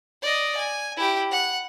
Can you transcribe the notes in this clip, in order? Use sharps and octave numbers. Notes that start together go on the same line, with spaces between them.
D5 D#5
G#5
E4 G4
F#5